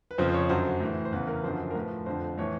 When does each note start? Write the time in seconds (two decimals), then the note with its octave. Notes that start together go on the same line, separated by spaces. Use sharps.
0.11 B4
0.18 F2 C#3 F3 C5
0.29 C5
0.34 C#5
0.49 F#2 D3 F#3 C5
0.80 A2 E3
1.05 C5
1.12 E2 C#3 E3 B4
1.28 A#4
1.43 F#2 D3 F3 C5
1.70 A#4
1.75 A2 F3 B4
2.06 F2 D3 F3 C5
2.38 A2 E3 C#5